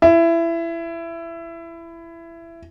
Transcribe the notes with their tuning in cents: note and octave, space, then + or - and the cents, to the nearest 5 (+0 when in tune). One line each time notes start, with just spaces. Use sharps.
E4 +20